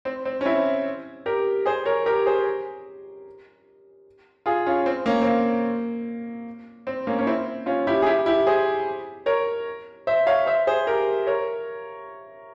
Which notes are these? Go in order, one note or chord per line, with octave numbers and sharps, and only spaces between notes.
C4
C4
C#4
C4 E4
G4 A#4
G#4 C5
A#4 C#5
G4 A#4
G#4 C5
F4 G#4
C#4 F4
C4
A#3 C#4
C4
A#3
C4
A#3 C#4
C#4
C4 E4
C#4 F4
E4 G4
G#4
E4 G4
E4 G4
G#4 C5
A#4 C#5
C5 E5
C#5 F5
C5 E5
G#4 C5
G4 A#4
A#4 C#5